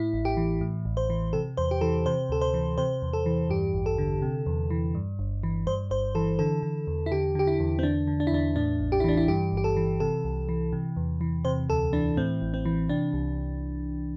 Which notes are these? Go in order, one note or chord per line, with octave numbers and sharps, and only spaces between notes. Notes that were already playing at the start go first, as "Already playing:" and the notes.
Already playing: A2 E4
A1
G4
E3
A2
A1
C5
E3
C3 A4
E2 C5
G4
E3 A4
C3 C5
D2 A4
C5
E3
C3 C5
E2
A4
E3
G2 G4
A1
A4
D3
C3
E2
E3
G2
G1
E3
G2 C5
G1 C5
E3 A4
D3 A4
D3
E2
E4
D3 G4
D3 G4
E4
E2
C4
D3 D4
D3
D4
E4
E2 D4
A2 D4
A1
G4
E4
E3 D4
E4
G2 G4
G1 G4
A4
E3
C3 A4
C2
E3
C3
E2
E3
C3 C5
D2 A4
E3 D4
A2 C4
A1
C4
E3
C3 D4
C2